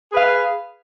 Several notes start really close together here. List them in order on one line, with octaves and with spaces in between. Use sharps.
G#4 B4 F5